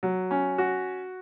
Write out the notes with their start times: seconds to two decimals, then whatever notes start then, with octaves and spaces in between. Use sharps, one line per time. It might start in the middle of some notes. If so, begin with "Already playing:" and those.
0.03 F#3
0.31 C#4
0.58 F#4